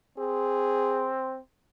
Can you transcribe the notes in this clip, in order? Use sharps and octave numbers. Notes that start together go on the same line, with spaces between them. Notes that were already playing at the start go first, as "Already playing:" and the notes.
C4 G#4